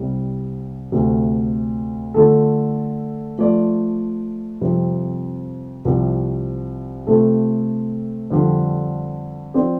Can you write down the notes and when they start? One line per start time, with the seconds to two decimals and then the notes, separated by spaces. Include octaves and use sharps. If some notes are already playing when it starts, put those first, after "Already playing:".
Already playing: C2 C3 G3
0.92 D2 C3 A3
2.14 D3 A3 F4 A4
3.38 F3 A3 F4 D5
4.61 F2 C3 G3 F4
5.85 C2 C3 F3
7.07 C3 A3 F4 A4
8.30 F2 D3 G3 D4 F4
9.54 F3 C4 F4 D5